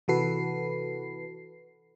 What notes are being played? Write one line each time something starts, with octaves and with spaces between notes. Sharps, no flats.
C3 E3 F#4 A4 B4 C7